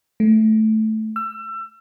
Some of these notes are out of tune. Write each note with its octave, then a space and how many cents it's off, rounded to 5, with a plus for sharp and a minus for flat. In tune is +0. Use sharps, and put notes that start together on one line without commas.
A3 -10
E6 +30